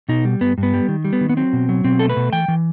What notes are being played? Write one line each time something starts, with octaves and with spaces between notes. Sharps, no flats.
B2 D#4
G3
G2 B3
G2
B3
G3
D#3
G3
B3
D#3
B3
F#3 C4
B2
F#3
B2 C4
A3 A4
B4
B2
E3 G5
E3